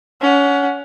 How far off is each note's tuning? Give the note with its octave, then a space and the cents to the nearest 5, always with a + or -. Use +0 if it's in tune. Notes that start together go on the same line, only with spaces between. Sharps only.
C#4 +25 F#5 -10